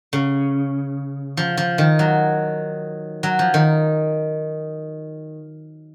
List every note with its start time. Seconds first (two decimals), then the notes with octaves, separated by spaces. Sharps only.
0.13 C#3
1.37 F3
1.57 F3
1.78 D#3
1.99 F#3
3.23 F#3
3.39 F3
3.54 D#3